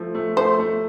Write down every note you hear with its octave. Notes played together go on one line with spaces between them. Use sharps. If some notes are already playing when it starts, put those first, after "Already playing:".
Already playing: F3 A3
A3
A3 C5
A3